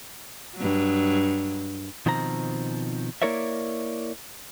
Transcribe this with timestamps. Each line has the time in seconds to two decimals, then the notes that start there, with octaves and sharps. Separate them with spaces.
0.56 G2 F#3
2.06 B2 D#3 F3 C4 A#5
3.22 A#3 E4 A#4 C#5 D5 E5